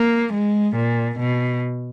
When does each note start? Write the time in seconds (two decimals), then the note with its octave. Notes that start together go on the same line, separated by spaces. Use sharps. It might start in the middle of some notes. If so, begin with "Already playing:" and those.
Already playing: A#3
0.33 G#3
0.76 A#2
1.19 B2